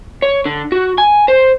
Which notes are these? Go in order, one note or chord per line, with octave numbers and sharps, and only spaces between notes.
C#5
D3
F#4
G#5
C5